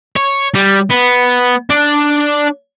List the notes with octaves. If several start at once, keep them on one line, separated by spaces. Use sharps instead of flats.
C#5
G3
B3
D4